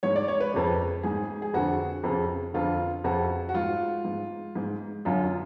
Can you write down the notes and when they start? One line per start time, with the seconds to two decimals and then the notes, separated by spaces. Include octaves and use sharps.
0.03 G#2 C#5
0.16 D5
0.28 C#5
0.40 B4
0.54 F2 C#3
1.03 G#2 G#4
1.42 G#4
1.54 F2 D3 F#4
2.03 F2 C#3
2.54 F2 D3 F4
3.04 F2 C#3 F#4
3.49 F#4
3.55 G#2 F4
4.05 G#2
4.55 G#2
5.05 F#2 D3 F4
5.23 F4